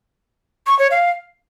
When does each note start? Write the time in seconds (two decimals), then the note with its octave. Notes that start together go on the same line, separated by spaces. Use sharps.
0.67 C#6
0.79 C#5
0.91 F5